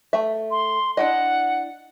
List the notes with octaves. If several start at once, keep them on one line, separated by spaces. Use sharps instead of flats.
A3 E5
C6
D4 E4 D#5 F#5